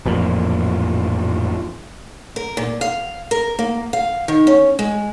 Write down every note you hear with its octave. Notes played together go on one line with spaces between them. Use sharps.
A1 F2 A#2
A#4
A#2
F5
A#4
A#3
F5
D#3
C#4
G#3